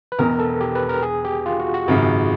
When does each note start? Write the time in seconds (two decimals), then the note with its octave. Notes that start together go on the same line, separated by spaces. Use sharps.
0.12 B4
0.19 E1 E2 B2 A#4
0.39 A4
0.61 G4
0.75 B4
0.89 A#4
1.03 G#4
1.25 G4
1.46 F4
1.60 F#4
1.74 F#4
1.88 G#1 F#2 C#3